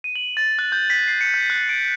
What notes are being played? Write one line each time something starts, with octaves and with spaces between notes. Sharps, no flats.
D#7
F#7
A6
F#6
G6
B6
C7
C#7
G6
F#6
D7